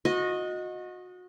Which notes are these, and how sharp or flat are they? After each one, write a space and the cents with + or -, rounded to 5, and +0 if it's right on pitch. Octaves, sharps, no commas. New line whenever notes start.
F#4 -30 D#5 +0